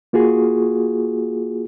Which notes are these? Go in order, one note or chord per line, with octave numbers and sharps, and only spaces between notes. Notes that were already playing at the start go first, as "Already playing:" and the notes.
A#3 F4 F#4 G#4